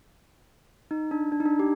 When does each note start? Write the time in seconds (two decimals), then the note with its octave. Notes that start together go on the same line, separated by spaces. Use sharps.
0.91 D#4
1.11 D4
1.32 D4
1.40 D#4
1.45 D4
1.59 G4